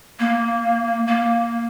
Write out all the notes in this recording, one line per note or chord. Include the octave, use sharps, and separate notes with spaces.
A#3
A#3